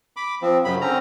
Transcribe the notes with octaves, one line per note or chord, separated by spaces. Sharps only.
B5 D6
F3 C4
F#2 C#3 F#3 B5
D3 C4 C#4 A#5